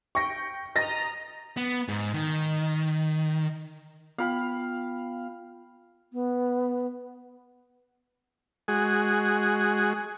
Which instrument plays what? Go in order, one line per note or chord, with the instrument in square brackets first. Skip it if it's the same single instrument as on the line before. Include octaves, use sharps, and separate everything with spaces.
[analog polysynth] G5 [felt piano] C#6 A#6
[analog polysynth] D#5 A#5 [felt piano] A6 A#6
[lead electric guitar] B3
G#2
D#3
[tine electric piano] B3 F4 G5 [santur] F5 B5
[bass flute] B3
[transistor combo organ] G#3 F#4 G#4